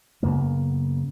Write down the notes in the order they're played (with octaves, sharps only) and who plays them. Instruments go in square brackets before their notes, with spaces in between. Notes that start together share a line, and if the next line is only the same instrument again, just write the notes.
[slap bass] F#2 C#3 A#3 B3